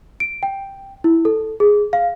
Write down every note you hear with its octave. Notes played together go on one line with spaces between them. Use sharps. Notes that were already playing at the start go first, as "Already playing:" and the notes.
D7
G5
E4
A4
G#4
F5